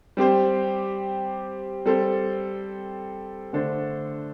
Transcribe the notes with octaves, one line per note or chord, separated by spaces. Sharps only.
G3 C4 G4 C5
G3 C4 A4 C5
D3 A3 D4 A4 C5